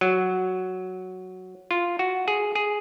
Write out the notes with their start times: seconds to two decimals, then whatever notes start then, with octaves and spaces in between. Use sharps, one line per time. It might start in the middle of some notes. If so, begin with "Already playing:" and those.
0.01 F#3
1.71 F4
1.99 F#4
2.28 G#4
2.55 G#4